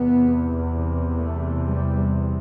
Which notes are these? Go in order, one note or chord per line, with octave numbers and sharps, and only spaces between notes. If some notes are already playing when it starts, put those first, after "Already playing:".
Already playing: E2 C3 B3
A3
G3